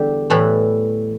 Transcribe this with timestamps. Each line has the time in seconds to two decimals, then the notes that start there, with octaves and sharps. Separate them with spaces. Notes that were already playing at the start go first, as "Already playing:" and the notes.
Already playing: E2 D3 G3 G4 A4
0.30 A2 E3 G3 B4